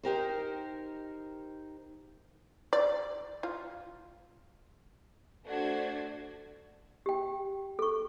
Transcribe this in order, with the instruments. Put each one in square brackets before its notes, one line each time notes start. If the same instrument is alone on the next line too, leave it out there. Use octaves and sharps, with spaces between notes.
[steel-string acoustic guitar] D#4 G4 A#4 C5
[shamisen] D5
F4
[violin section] A3 D4 F#4 C5 D5 G#6
[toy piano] G4 G5
A4 C#6